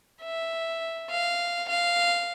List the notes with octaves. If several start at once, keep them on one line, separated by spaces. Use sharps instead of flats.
E5
F5
F5